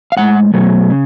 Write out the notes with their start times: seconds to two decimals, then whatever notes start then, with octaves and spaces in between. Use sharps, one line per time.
0.12 F5
0.17 A2 G#3 F#5
0.54 B2 F#3 A3
0.90 C#3